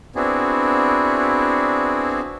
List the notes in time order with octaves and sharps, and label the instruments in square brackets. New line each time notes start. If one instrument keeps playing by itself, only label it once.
[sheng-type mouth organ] B3 C4 D4 E4 F#4 G#4